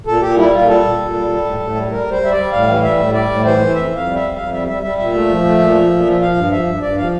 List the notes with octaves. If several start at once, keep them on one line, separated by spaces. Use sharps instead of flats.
A#2 A4
A#2 G4
G3 E4
A#2 F4
G3 A4
A#2
A#2
G3
G3
A2
A2
G3
G3 A#4
G3 C5
G3 E5
D5
G3
A2 F5
E3
G3 E5
A2
G3 D5
A2
E3 C5
E3
F2 E5
F2
F5
G3
E5
F2
F2 F5
G3 E5
G3 E5
G3 E5
A#2 E5
A3
F3
A3
A#2
F3
A#2
F3
F3 F5
G2
F3 E5
G2
G2 D5
F3 F5